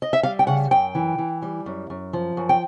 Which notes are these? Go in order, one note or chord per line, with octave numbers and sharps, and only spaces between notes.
D#5
E5
G3 F5
G5
C#3 F#5
F#2 G5
E3
E3
G3
F#2
F#2
F3
F#2
G5